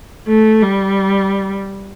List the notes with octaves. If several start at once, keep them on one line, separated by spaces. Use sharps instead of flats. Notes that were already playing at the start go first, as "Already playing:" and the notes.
A3
G3